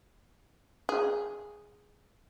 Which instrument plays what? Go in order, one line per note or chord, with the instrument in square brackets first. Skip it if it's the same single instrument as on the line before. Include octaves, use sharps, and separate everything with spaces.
[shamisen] G#4